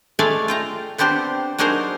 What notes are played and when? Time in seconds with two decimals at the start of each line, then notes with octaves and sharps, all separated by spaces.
0.19 G#3 A3 G#4 A4 D5 F5
0.48 F4 G5 A#5
0.98 B3 C4 D4 G4 C5
1.58 F#3 D4 D#4 G#4 A#4 C5